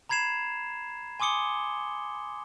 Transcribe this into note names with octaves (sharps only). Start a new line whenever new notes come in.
A#5 B5 G#6 C7 E7 F7
G#5 C6 D6 D#6 C#7 G7